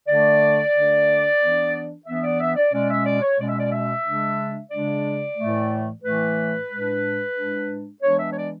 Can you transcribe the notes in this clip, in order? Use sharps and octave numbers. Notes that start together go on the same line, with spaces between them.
D3 A3 D4 D5
D3 A3 D4
E3 B3 D4
E3 B3 D4 E5
D5
E5
D5
B2 G#3 C#4 D5
E5
D5
C#5
B2 G#3 C#4 D5
E5
D5
E5
C#3 G#3 D4
C#3 G#3 D4 D5
A2 E3 A3
A2 E3 A3 B4
A2 G#3 D4
A2 G#3 D4
E3 G#3 B3 D4 C#5
E5
C#5
D5